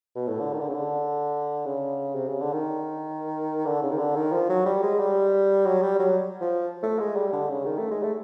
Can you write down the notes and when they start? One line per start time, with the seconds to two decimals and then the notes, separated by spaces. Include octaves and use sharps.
0.16 B2
0.28 A2
0.40 D3
0.54 D#3
0.60 D3
0.68 C#3
0.75 D3
1.66 C#3
2.16 C3
2.28 C#3
2.41 D3
2.53 D#3
3.66 D3
3.83 C#3
3.92 D#3
3.99 D3
4.16 D#3
4.33 F3
4.50 F#3
4.66 G3
4.83 G#3
4.99 G3
5.66 F#3
5.83 G3
6.00 F#3
6.41 F3
6.83 A3
7.00 G#3
7.16 G3
7.33 D3
7.50 C#3
7.66 D#3
7.79 A3
7.91 G#3
8.03 A3